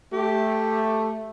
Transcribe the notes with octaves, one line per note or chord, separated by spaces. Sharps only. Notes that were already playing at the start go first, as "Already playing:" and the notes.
A3 G4